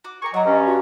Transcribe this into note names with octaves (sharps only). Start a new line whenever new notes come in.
F#4 D6
G#4 G5 A#5 C#6
F#3 D5 D#5 A#5
G2 C#4
F#4